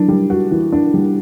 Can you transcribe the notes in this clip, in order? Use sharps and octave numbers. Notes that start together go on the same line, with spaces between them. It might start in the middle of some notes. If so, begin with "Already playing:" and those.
Already playing: E3 F#3 D4
G3
F#4
E3
D4
G3